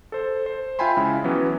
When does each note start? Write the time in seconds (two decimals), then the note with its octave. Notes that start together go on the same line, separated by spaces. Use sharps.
0.12 A4 C5
0.46 C5
0.79 F4 E5 G5 G#5 B5 C6
0.97 C#3 G#3 E4
1.24 E3 F#3 B3 C#4